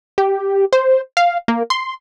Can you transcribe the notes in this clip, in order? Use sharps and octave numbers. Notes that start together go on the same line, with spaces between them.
G4
C5
F5
A#3
C6